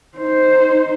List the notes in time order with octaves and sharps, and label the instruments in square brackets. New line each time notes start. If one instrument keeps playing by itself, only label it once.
[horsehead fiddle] D#4 C5